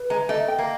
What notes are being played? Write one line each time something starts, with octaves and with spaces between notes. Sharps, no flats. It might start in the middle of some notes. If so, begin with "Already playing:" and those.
Already playing: B4
G#3 A#5
A3 D#5
G5
A#3